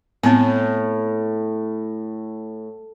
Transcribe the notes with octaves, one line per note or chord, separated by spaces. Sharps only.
A2 B3 C4